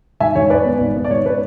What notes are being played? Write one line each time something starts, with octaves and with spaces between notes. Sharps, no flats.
G#2 E5 G#5
G#2 C#5
G#2 B4 D5
B3
G#1
B3
D5
G#2 C#5
B4